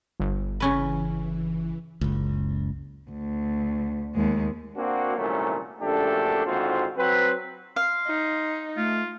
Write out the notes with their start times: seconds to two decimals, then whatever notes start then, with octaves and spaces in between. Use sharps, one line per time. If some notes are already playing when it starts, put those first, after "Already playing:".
0.20 G1
0.60 C#3 E3 C#4 B4
2.01 F#1 C#2
3.10 D2
4.15 D#2 G#3
4.76 A#3 C4 D4 F#4
5.17 C2 A#2 D#3 F#3 A3 C#4
5.81 A#1 F#2 A3 D4 G4 A4
6.45 D#2 G#2 D3 C4 F4 F#4
6.97 F#3 C4 B4
7.76 F5 C6
8.07 D#4
8.77 A3 F4